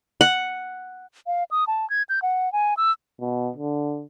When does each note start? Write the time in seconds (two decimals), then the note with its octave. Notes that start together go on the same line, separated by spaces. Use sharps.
0.21 F#5
1.27 F5
1.51 D#6
1.67 A5
1.90 G#6
2.09 G6
2.22 F#5
2.53 G#5
2.77 E6
3.20 B2
3.56 D3